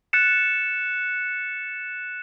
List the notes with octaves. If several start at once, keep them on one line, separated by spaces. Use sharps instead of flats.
F#6 A6 C#7 E7